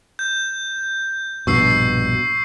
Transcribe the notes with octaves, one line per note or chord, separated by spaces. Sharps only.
G6
A#1 G2 B2 C#6 E6 C7